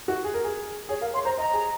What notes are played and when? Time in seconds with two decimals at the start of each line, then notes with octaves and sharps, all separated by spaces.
0.08 F#4
0.24 G#4
0.34 A#4
0.44 G#4
0.89 G#4 C#5
1.01 A#4 F5
1.13 C#5 C6
1.25 C5 A#5
1.38 D#5 A#5
1.53 G#4